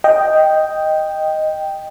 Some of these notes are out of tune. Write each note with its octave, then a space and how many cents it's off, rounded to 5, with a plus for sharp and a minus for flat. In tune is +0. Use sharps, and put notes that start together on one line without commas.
D#5 +0 G5 +0